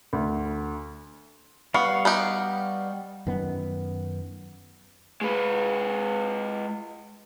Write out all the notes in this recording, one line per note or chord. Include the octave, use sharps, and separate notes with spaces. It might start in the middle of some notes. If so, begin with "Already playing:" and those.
D2
G3 B3 F5 C#6
B3 D#4 G4
F#2 D#3 B3
G#3 B4